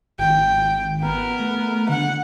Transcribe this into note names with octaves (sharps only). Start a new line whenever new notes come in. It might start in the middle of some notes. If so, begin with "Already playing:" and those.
G#1 G5
B3 A#4
A3
D3 F#5